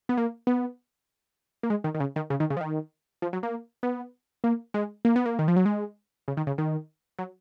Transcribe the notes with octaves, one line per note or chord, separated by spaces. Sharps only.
B3
A#3
B3
A#3
G#3
D#3
D#3
C#3
D#3
C#3
D#3
C#3
F3
D#3
F3
F#3
A#3
B3
A#3
G#3
A#3
B3
A#3
D#3
F3
F#3
G#3
C#3
D#3
C#3
D#3
F#3